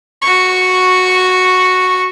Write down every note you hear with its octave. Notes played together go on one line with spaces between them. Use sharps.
F#4 C#6